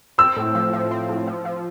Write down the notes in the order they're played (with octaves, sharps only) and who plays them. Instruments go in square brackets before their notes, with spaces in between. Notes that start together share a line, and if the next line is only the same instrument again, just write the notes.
[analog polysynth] C4 [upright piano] E6
[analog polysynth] A2
F3
F3
C4
A2
F3
F3